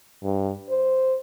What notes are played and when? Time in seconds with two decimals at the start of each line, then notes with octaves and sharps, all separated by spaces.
0.23 G2
0.69 C5